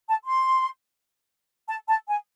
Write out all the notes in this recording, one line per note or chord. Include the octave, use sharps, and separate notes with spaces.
A5
C6
A5
A5
G#5